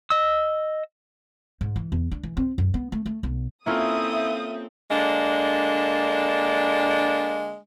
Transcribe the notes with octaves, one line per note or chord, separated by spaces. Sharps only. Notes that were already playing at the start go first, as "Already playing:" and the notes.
D#5 E6
G#2
E3
E2
D4
E3
C4
F#2
B3
A3
A3
B1
A#3 C4 C#4 E4 F4 A4 E5 D#6
D3 G#3 A#3 D4